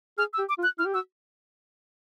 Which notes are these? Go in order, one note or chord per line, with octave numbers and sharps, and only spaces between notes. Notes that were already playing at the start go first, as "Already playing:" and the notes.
G#4 F6
E6
G4
D6
F4
F#6
E4 F6
G4
F#4 E6